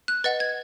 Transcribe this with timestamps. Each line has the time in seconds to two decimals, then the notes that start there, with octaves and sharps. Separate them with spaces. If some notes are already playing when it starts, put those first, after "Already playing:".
0.08 F#6
0.24 B4 D#5 F#5 A6
0.40 G#6